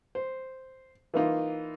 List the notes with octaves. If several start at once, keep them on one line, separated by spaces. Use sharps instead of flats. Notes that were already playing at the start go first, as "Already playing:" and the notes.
C5
E3 A#3 D#4 F4